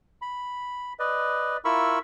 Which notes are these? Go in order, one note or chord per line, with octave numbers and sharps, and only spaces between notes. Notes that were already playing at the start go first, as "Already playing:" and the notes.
B5
B4 D5 D#5
E4 F4 A#4 B5 C#6 E6